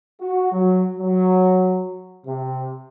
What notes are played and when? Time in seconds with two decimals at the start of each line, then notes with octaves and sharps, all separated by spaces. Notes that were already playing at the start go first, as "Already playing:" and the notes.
0.21 F#4
0.51 F#3
0.98 F#3
2.26 C3